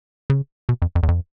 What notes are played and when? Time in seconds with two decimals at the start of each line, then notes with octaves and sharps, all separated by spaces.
0.30 C#3
0.69 B2
0.82 F2
0.95 F2
1.03 E2
1.08 F2